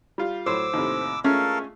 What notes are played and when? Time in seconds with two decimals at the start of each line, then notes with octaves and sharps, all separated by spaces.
0.18 G3 F4
0.46 A2 F#3 C5 D6 E6
0.73 D#2 A2 C3
1.24 G#3 A3 C#4 F4 A4 A#4 F5